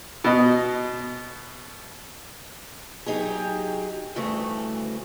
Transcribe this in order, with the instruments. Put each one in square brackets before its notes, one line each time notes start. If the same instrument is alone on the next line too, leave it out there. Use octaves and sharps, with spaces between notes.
[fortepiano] B2 D#5
[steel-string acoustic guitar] F#3 D#4 G4 G#4
D2 G2 C#3 E3 A3 F#4